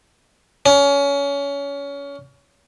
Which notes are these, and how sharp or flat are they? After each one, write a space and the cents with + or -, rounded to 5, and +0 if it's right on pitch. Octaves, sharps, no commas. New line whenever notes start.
C#4 +25